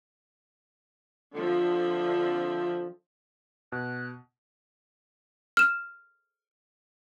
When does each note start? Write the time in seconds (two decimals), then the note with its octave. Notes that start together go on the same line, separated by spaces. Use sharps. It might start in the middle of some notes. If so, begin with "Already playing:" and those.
1.34 D3 F3 C4 E5
3.72 B2 F#6
5.57 F6 E7